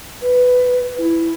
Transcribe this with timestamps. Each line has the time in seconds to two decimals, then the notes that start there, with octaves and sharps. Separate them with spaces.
0.22 B4
0.99 E4